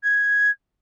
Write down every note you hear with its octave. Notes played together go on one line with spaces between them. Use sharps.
G#6